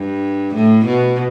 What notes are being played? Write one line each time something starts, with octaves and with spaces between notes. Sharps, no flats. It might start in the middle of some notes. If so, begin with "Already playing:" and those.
Already playing: G2
A2
B2